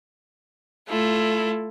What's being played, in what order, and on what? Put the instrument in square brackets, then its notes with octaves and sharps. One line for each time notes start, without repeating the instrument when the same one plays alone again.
[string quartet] A3 E4 F4 A4